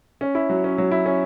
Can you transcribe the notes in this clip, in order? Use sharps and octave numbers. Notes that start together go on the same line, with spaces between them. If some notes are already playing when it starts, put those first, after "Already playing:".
C#4
E4
F#3
C#4
F#3
E4
C#4